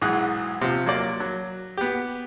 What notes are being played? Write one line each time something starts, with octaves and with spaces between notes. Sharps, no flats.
B1 G#2 E3 G#4 D#6 F#6
C3 F3
F#3 A#3 D5
F#3
B3 G4